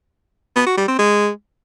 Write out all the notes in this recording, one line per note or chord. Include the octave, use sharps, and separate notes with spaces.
B3
F#4
G3
C4
G#3